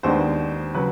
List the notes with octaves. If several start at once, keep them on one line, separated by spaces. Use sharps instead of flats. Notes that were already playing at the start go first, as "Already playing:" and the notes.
D#2 D#3 G#3 B3 D4 C5
C#3 F#3 B4